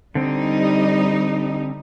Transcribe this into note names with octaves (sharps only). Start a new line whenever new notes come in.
D3 G3 C4 D#4